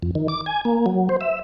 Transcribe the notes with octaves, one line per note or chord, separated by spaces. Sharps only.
F2
D#3
D6
G#5
A#3
F#3
C5
E5